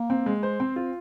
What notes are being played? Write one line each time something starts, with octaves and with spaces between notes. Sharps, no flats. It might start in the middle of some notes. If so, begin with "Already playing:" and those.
Already playing: A#3
C4
G#3
C5
C4
F4